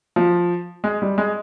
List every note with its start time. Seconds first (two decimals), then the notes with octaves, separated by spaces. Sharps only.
0.16 F3
0.84 G#3
1.02 G3
1.18 G#3